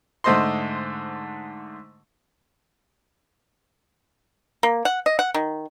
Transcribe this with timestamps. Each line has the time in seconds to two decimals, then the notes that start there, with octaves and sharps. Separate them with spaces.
0.24 G#2 D3 A3 C5 D#5 C6
4.63 A#3
4.85 F#5
5.06 D#5
5.19 F#5
5.34 D#3